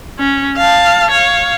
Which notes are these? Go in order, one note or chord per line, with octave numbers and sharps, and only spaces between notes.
C#4
F5 A5
C#5 F5